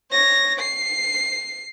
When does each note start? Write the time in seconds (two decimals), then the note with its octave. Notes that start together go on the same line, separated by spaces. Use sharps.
0.11 C#5 A#6
0.60 C7